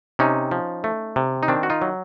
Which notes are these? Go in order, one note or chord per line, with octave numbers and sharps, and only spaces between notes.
C3 C#4 D#4
F3
A3
C3
D#4
D#3 C4 D4
F#4
D#4 F4
F#3